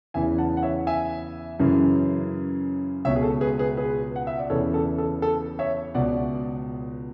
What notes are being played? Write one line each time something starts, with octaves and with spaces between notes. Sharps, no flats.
E2 C#3 E3 E5 G#5
F#5 A5
F#5
C#5 E5
E5 G#5
F#2 C#3 E3
C#2 B2 C#5 E5
G#4
A4
G#4 B4
G#4 B4
G#4 B4
F#5
E5
D5
E2 C#3 E3 A4 C#5
A4
A4
A4
C#5 E5
C#2 B2 D5 F#5